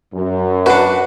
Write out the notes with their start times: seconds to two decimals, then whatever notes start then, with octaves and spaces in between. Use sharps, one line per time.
0.15 F#2
0.66 D4 F#4 B4 F#5